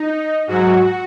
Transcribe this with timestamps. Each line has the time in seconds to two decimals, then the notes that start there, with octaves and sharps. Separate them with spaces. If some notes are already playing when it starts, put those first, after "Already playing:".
Already playing: D#4
0.47 G#2 F#3 F#4